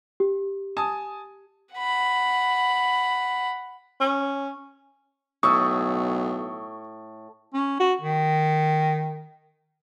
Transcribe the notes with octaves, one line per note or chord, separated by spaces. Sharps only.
G4
G#5 A5 D#6
F#5 B5
C#4
B1 A2 C#6 D#6 E6
C#4
F#4
D#3